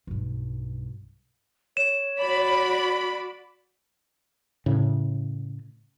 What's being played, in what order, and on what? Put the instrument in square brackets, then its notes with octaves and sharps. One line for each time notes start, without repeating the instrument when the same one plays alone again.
[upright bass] B1 G2
[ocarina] C#5 [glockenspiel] E7
[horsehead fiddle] F#4 D5 [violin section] B5
[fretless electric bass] A2 C#3